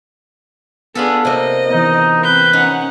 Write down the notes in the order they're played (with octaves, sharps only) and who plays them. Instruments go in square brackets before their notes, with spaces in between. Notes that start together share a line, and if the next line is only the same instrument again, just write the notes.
[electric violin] B3 G#4 [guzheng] D4 F4 A4
[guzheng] C3 A#3 [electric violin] D#5
[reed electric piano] E3 B3 [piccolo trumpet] D#4
[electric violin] C4 G6 [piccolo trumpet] B4
[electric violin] C#4 F#5 [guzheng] D#4